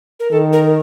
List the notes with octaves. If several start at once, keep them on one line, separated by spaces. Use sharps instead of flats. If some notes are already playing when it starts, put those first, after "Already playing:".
A#4
D#3 A4
A#4